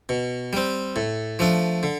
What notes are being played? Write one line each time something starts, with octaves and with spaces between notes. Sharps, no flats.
B2
G3 C4
A2
F3 A3 D4
D3